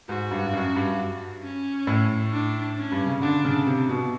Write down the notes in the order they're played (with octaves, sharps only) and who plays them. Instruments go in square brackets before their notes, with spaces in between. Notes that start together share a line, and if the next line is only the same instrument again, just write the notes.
[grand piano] G#2 [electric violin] F#4
[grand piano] G2
G2
F#2
G2
[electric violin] C#4
[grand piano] A2
[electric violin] D4
C#4
[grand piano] G2
C#3
[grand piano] D3 [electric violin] D4
[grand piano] C#3
C3
B2